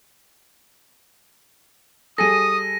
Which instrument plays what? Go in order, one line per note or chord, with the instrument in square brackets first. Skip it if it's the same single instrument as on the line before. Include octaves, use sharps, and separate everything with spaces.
[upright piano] G3 G#4 A4 [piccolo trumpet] D#6 [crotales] A#6 D#7